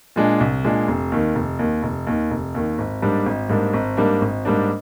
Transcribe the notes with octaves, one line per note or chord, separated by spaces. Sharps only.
A#2 G#3 D4
C2
A#2 G#3 D4
F1
D#2 D#3
F1
D#2 D#3
F1
D#2 D#3
F1
D#2 D#3
G#1
G#2 G3 A#3 D4
G#1
G#2 G3 A#3 D4
G#1
G#2 G3 A#3 D4
G#1
G#2 G3 A#3 D4